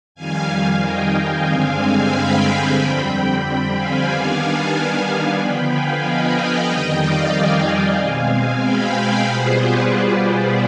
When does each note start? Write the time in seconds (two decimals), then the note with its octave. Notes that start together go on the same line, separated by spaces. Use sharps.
0.15 F2 D#3 G3 F5 G#5
0.47 F5 G#5
0.80 D#5 G5
1.46 G2 D3 G#3 C4 F5 G#5
2.11 G5 B5
2.43 F5 G#5
2.76 F2 D3 G3 C4 G5 B5
3.74 F5 G#5
4.06 D#3 G3 B3 D4 F5 G#5
4.39 F5 G#5
4.71 F5 G#5
5.36 D3 F3 B3 G5 B5
5.69 F5 G#5
6.02 D#5 G5
6.67 F2 D#3 G3
6.99 D5 F5
7.32 F5 G#5
7.97 B2 G#3 C4 F5 G#5
8.62 G5 B5
8.95 F5 G#5
9.27 B2 G3 B3 F4 G#4 C5
9.59 B4 D5
9.92 G#4 C5
10.25 B4 D5